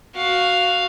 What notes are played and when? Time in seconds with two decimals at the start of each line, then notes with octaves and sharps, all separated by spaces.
0.15 F#4 F5